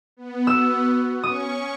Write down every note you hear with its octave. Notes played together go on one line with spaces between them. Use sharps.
B3
F#4 E6
C#4 C#6 D#6